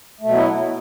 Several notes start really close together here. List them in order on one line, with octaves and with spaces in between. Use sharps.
A3 B2 F#3 B3 E4